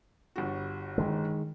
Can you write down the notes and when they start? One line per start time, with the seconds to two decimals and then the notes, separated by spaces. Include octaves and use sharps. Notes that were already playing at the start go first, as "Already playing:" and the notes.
0.36 G1 G3 F#4
0.98 D#3 G#3